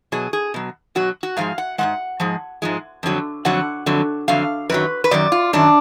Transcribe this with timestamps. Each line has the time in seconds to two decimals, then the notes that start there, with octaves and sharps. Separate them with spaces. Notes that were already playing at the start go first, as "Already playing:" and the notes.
0.12 B2 F#3 G#4
0.33 G#4
0.54 B2 F#3
0.95 B2 F#3 F#4
1.23 F#4
1.37 G#2 F3 G#3 F5
1.58 F#5
1.78 G#2 F3 G#3 F#5
2.20 G#2 F3 G#3
2.62 G#2 F3 G#3
3.03 F2 D3 F#3
3.45 F2 D3 F#3 F#5
3.86 F2 D3 F#3
4.28 F2 D3 F#3 F5
4.69 F#2 D#3 F#3 B4
5.04 B4
5.11 F#2 D#3 F#3 D5
5.32 F4
5.53 F#2 D#3 F#3 D4